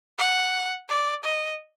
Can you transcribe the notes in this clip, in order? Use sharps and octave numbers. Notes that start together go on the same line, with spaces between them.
F#5
D5
D#5